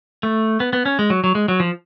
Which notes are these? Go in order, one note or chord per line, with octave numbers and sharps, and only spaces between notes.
A3
B3
B3
C#4
G#3
F#3
F#3
G#3
F#3
F3